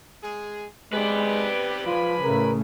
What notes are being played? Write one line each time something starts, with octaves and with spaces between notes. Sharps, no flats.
G#3 G#4
G#3 B3 C4 G4 B4 D5
F3 G#3 F4 G#5 B5
A2 C#3 A3 A#4